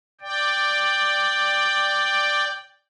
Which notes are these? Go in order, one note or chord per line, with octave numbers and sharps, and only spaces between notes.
D5 G5